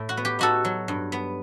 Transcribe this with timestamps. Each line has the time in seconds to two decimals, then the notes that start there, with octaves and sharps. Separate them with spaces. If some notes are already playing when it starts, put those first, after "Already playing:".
Already playing: A2 A3
0.09 F#4
0.17 B3
0.25 G4
0.39 D#4 F#4 A4
0.65 F#3
0.88 G2
1.12 B3